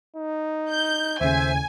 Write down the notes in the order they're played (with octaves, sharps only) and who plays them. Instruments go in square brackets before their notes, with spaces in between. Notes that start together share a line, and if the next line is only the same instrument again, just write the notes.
[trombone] D#4
[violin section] G6
[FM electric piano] D#2 C#3 [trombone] A2 [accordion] C5 E5 [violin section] G#5